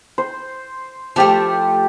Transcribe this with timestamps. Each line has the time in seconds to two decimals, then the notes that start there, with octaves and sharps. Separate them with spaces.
0.18 C5
1.16 F3 A3 G4 D5 A5